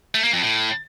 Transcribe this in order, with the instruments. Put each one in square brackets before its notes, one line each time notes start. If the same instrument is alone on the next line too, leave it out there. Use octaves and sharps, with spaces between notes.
[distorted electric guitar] A3
A#3
F2
A2